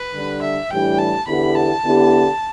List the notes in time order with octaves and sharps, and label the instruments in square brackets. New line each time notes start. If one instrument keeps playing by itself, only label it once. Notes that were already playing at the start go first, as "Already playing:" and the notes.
Already playing: [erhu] B4
[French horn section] D3 G3 D4
[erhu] E5
[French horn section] A2 E3 G3 D4 G4 [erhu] G5
[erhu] A5
[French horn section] E2 D3 B3 E4 G4 [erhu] B5
[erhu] A5
[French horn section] D3 B3 E4 G4